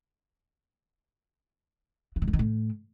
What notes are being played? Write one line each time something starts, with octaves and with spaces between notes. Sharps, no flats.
E3
D#3
G2
D#3
A2